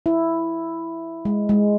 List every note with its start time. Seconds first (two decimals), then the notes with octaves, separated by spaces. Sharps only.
0.06 E4
1.25 G#3
1.49 G#3